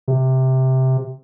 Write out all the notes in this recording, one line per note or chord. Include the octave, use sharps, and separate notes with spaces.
C3